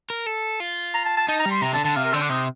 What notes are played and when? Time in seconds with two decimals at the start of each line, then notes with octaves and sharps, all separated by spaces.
0.10 A#4
0.26 A4
0.60 F4
0.94 A#5
1.05 A5
1.17 A5
1.28 D#4 A5
1.40 A#5
1.46 G3
1.51 C6
1.61 C3 A#5
1.73 D3 A5
1.85 D3 A5
1.96 C3 F5
2.04 A#4
2.13 D3 C4
2.21 D4
2.29 C3 D#4